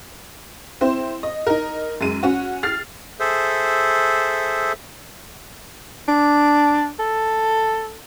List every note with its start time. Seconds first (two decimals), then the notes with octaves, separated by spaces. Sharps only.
0.81 C4 E4 C5
1.23 D#5
1.47 D#4 A#4
2.01 F#2 G#3 D#7
2.23 C#4 F#4
2.63 F6 A6 C7
3.20 G#4 A4 C5 E5
6.08 D4
6.99 A4